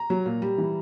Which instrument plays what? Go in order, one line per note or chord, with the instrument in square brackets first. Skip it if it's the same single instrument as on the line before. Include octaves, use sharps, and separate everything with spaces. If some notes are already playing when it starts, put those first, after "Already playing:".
Already playing: [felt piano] A#5
F#3
A#2
G3
E3